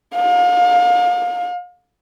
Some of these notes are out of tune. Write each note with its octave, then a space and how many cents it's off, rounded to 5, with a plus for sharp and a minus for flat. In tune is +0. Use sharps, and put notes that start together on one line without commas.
F5 +35